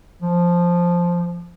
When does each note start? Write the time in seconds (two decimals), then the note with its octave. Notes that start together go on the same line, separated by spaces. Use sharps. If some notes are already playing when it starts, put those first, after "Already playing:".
0.23 F3